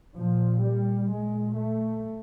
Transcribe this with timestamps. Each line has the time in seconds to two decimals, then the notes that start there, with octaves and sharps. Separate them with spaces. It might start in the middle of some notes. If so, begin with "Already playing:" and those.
0.15 A#2 F3
0.62 G3
1.08 A#2 G#3
1.55 A3